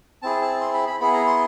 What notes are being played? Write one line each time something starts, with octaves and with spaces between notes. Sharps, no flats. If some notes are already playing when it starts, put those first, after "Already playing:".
C4 E4 G#4 A5
A5
C6
B5
B5
B3 E4 G#4 B5
A#5
C6